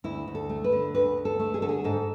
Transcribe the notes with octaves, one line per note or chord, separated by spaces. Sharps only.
D2 E4
D2
A4
A3
B4
D3
D2 B4
D2
A4
A3
G#4
D3 A4
G#4
G#2 A4